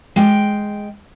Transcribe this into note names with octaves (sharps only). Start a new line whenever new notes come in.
G#3 G5